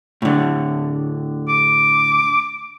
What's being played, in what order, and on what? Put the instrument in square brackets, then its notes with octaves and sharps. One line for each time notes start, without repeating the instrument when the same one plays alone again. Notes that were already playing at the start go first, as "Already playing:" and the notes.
[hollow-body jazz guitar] A2 D3
[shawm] D6